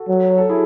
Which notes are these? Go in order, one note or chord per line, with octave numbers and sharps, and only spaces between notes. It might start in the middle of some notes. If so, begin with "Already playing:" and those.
Already playing: F#4 A4
F#3
A4
E4 G#4